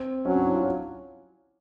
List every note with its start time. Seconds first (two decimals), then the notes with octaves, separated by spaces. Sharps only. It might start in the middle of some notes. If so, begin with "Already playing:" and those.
Already playing: C4
0.26 F#3 C#4
0.36 D4
0.45 E4
0.56 F4